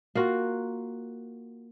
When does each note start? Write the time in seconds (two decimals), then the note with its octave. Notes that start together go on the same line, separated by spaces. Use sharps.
0.15 A#3 F4 F#4